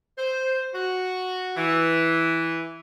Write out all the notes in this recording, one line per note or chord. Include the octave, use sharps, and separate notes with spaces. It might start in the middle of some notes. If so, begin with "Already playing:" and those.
C5
F#4
E3